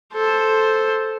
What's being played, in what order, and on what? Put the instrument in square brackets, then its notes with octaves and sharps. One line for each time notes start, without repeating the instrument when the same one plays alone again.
[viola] A4 C5